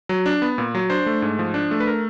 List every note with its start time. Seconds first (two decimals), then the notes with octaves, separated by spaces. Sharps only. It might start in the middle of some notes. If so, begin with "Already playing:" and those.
0.09 F#3
0.26 D4
0.42 B3
0.58 A#2
0.75 F#3
0.90 D4 C5
1.06 A3
1.22 G#2
1.39 F3
1.54 D4
1.71 A3
1.80 B4
1.87 A#4